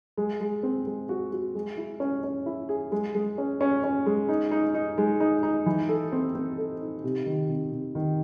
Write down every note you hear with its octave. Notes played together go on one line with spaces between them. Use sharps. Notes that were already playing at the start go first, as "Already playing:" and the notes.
G#3
G#3
C4
G#3
F#4
F#4
G#3
E4
C#4
C#4
E4
G#4
G#3
G#3
C#4
C#4
C#4
G#3
D#4
D#4
D#4
G#3
D#4
D#4
E3
A4
C4
C4
A4
D#4
C3
D#3
C3
C3
D#3